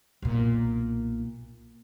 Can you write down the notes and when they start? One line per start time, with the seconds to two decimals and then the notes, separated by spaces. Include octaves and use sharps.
0.22 B1 A#2